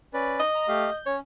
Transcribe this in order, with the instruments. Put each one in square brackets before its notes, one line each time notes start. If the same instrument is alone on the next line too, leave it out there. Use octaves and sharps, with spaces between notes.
[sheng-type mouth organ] C#4 B4 D5
[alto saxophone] D#5
[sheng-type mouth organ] A#5
A3 G4 F5
G6
[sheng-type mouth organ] C#4 [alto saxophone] C#5